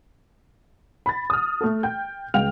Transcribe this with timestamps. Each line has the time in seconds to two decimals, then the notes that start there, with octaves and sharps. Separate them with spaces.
1.06 B5 A6
1.30 D#6 F6
1.61 A3 A4
1.83 G5 G6
2.34 C#2 F5 G5 F6 F7